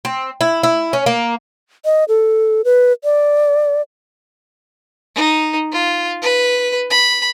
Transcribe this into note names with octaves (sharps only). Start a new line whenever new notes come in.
C4
E4
E4
C#4
A#3
D#5
A4
B4
D5
D#4
F4
B4
B5